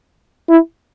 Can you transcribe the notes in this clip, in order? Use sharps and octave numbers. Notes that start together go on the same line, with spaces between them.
E4